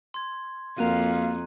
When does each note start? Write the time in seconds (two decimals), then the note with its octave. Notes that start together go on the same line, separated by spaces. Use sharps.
0.14 C6 G#6
0.78 F2 A#3 F#4 F5 A#5 F#6 D#7